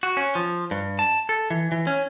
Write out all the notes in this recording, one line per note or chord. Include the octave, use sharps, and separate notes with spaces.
F#4
C#4
F3
G2
A5
A4
E3
E3
C#4